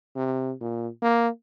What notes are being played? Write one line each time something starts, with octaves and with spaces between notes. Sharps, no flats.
C3
A#2
A#3